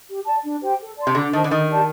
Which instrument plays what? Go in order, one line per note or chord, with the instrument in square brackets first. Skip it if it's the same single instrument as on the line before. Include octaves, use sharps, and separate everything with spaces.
[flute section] G4
D5 A5
D4
G4 C5 G5
A4
D5 A5 C6
[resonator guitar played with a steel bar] C3
[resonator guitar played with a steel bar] D3 [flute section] F#4
[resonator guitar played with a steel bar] D#3 [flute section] C5 D#5 A5
[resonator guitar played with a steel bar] D3
[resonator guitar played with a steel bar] D#3 [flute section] D#4
[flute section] G4 D5 A5